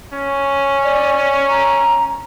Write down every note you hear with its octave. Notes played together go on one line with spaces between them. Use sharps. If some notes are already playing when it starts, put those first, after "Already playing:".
C#4
D5
A#5